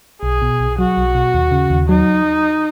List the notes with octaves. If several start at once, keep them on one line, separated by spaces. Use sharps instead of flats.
B1 G#4
B2
B1
F#3 F#4
B1
B2
D#2
C#3
D#2
F#3 D#4